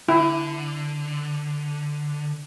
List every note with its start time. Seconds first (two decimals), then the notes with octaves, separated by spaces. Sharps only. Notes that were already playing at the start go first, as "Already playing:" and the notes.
0.08 D3 E4